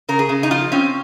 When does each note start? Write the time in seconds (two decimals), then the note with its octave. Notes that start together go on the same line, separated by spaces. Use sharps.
0.09 C#3 A#4
0.19 G#4
0.29 C#3
0.43 D#4
0.51 F3 F4
0.72 C4 C#4